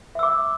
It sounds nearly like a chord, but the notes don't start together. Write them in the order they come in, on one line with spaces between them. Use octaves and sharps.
E5 E6 D6